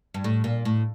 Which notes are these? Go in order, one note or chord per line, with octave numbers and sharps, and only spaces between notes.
G2
A2
A#2
A2